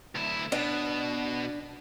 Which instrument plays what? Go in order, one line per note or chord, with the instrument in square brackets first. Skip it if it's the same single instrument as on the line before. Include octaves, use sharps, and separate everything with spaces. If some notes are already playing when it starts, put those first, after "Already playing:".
[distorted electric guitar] D2 E4
[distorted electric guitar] B2 [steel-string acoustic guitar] D4